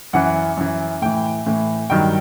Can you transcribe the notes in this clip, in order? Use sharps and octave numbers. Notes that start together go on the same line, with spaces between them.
F#2 E3 F#5
F#2 E3
A2 E3 G5
A2 E3
G2 D#3 F#3 G5